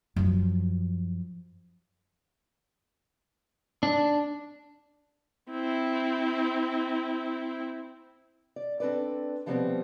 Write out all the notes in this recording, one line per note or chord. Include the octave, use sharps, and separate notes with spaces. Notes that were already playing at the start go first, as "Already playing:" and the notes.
F#2 F3
D4
C4 E4
D5
C4 D4 A4 B4 D5
B2 F3 G3 A3 B3 C4